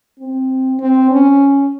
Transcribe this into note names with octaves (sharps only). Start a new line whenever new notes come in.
C4
C4
C#4